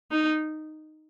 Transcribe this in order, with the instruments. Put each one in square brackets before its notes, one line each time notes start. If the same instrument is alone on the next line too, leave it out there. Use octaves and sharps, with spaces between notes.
[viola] D#4